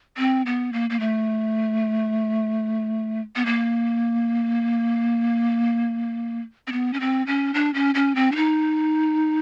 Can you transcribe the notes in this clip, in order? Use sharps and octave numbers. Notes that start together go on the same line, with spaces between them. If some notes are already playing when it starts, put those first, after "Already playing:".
C4
B3
A#3
A#3
A3
B3
A#3
C4
B3
C#4
C4
C#4
D4
C#4
C#4
C4
D4
D#4